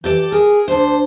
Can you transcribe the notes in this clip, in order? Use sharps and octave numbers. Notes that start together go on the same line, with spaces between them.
E3 G4 A4 D5
G#4 A#4
D2 D4 C5